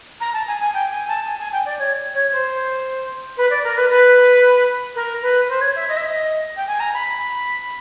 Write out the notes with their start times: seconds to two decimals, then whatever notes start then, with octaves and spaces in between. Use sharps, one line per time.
0.21 A#5
0.34 A5
0.47 G#5
0.61 G#5
0.74 G5
0.91 G#5
1.08 A5
1.27 G#5
1.39 G#5
1.52 G5
1.66 D5
1.79 C#5
2.14 C#5
2.32 C5
3.37 B4
3.50 D5
3.64 A#4
3.76 B4
3.90 B4
4.95 A#4
5.22 B4
5.49 C5
5.61 C#5
5.75 E5
5.88 D#5
5.97 E5
6.05 D#5
6.57 G5
6.67 G#5
6.80 A#5
6.94 B5